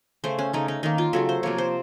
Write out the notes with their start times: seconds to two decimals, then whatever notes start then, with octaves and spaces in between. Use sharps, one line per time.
0.24 C#3 A3 C5
0.39 C#4
0.53 C#3 A3 D#4
0.68 D#4
0.83 D#3 A#3 D#4
0.98 F4
1.13 C#3 F#3 A3 A4
1.29 C5
1.43 C3 F3 A#3 C#5
1.58 C5